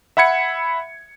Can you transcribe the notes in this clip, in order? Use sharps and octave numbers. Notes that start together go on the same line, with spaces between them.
E5 F#5 B5 G#6 C#7